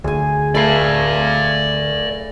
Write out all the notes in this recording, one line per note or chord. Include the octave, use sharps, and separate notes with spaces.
D2 G#4 G#5
A3 D5 F5 B5